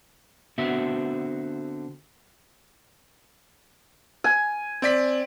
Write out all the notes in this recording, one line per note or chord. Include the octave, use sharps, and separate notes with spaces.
D3 B3 C4 F#4 E5
G#5
C4 D5 B6